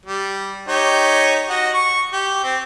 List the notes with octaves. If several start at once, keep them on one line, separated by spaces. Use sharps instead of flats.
G3
D#4 G4 C#5
F#4 D#5
C#6
G4
C4